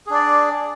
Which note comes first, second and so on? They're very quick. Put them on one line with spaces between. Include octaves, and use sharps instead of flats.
G#4 D4 D5